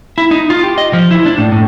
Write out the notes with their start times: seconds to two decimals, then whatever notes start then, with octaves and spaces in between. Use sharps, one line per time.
0.18 E4
0.31 D#4
0.50 F4
0.63 G4
0.78 D#5
0.93 F3
1.11 E4
1.26 D4
1.38 A2
1.52 A2